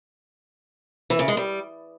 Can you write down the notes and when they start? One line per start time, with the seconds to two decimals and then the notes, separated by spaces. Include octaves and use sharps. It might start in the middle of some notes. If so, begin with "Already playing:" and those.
1.10 E3
1.19 C#3
1.28 G#3
1.37 G3